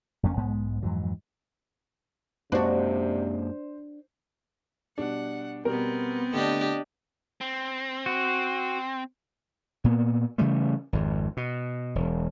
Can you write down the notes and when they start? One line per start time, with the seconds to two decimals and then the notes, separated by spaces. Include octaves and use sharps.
0.23 F#1 F2 A#3 C#4
0.37 B1 G#2 G#3 B3
0.82 F2 G#2 E3 F#3
2.52 F#2 C3 G#3 A#3 D4 F#4 C5
4.98 B2 G3 D4 F#5
5.65 B2 G3 B3 C4 A#4
6.33 D3 A3 D4 G4 D#5
7.41 C4
8.06 F#4
9.84 A#2 A#3 B3
10.38 C#3 E3 G3 A3
10.93 G#1 F2
11.37 B2
11.95 E1